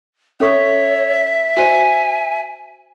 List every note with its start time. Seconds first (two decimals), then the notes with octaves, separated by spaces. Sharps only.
0.40 C#4 A4 C#5 E5 C#6
1.57 F#4 C5 D5 G#5